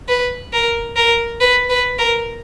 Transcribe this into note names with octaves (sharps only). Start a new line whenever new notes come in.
B4
A#4
A#4
B4
B4
A#4